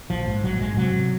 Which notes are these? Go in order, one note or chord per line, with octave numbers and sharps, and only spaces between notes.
A#1 F3
G#2
A#1 F#3
G#2 G#3
C3 F#3
C3